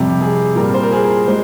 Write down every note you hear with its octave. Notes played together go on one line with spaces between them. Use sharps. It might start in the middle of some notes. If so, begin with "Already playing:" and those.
Already playing: F2 C3 G3 G4
G#4
A#2 G3 A#4
C5
A#4
G#4
A#4
G#3 C5